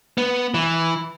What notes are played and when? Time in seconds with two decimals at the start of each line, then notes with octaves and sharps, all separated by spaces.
0.18 B3
0.54 E3